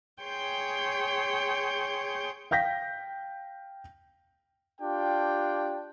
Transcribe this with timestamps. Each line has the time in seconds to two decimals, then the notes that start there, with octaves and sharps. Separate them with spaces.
0.22 G#4 C#5 G5 C6 G6
2.51 F5 G5 G6 A#6 B6
4.81 D4 F4 G4 G5